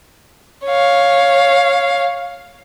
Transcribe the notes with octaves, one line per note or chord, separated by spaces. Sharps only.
C#5 F5